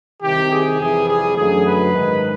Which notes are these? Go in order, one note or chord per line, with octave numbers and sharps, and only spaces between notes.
C2 C3 D#3 G4
G#4
F2 C3 E3 G3 G#4
G#4
F#2 D3 F#3 A3 G#4
B4
G#2 D#3 G#3